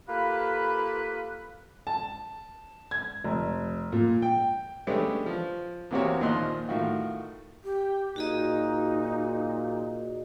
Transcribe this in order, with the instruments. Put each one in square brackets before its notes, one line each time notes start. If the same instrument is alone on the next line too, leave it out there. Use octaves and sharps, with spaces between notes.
[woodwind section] A#3 F4 G4 A4 B4
[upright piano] A5
G#6
F1
A#2
G5
[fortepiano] G#3 A3 B3 C#4 D4 G4
F3
E2 A#3 C4 F#4 G4 C#5
D#2 A#2 F3 D#5 C6 F#6
A2 D#3 F4 F#4
[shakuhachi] G4
[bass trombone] A#2 [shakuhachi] D#4 [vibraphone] F#4 G#4 D#5